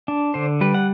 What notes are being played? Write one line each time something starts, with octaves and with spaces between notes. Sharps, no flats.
D4
D3 C5
G3 B4
F#5